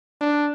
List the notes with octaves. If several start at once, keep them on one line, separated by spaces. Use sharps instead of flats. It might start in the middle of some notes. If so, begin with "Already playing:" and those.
D4